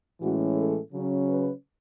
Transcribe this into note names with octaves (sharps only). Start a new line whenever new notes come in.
A2 E3 G#3 C#4 F#4
A4
C#3 F#3 C#4
B4